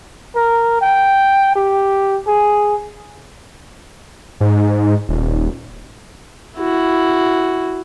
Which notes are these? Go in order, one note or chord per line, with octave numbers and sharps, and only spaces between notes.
A#4
G5
G4
G#4
G#2
D#1
E4 F#4